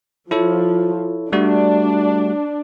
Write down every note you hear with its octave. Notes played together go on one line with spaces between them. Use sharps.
F3 E4 A4 C#5
G3 A3 D4 F#4